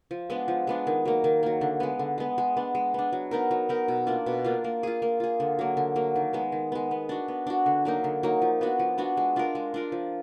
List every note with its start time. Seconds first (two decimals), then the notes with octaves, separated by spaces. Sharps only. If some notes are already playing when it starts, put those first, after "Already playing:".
0.11 F3
0.30 G#3 B3 D4
0.48 F3
0.67 G#3 B3 D4
0.87 D#3
1.05 F#3 A#3
1.24 D#3
1.43 F#3 A#3
1.61 D3
1.80 G#3 B3
1.99 D3
2.18 G#3 B3
2.38 G#3
2.57 B3 D4
2.75 G#3
2.94 B3 D4
3.13 F#3
3.31 B3 D#4 A#4
3.51 F#3
3.69 B3 D#4 A#4
3.88 B2
4.07 A#3 D4 F4
4.26 B2
4.44 A#3 D4 F4
4.64 A#3
4.83 F4 G#4
5.02 A#3
5.20 F4 G#4
5.40 D3
5.59 F#3 A#3
5.77 D3
5.96 F#3 A#3
6.16 D#3
6.33 G#3 B3
6.52 D#3
6.72 G#3 B3
6.91 B3
7.09 D4 F#4
7.28 B3
7.47 D4 F#4
7.66 D3
7.85 F#3 A#3 D#4
8.04 D3
8.23 F#3 A#3 D#4
8.42 F3
8.61 B3 D4 F#4
8.79 F3
8.98 B3 D4 F#4
9.17 G#3
9.36 D4 F4 A#4
9.55 G#3
9.74 D4 F4 A#4
9.92 F3